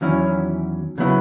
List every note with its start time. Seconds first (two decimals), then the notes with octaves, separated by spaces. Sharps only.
0.01 E2 D#3 F#3 C#4 E4
0.98 C#3 F#3 B3 E4